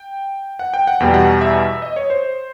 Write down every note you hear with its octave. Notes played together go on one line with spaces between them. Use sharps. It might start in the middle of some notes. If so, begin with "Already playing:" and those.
Already playing: G5
F#5
G5
F#5
E2 B2 G3 G5
F#5
E5
D#5
C#5
C5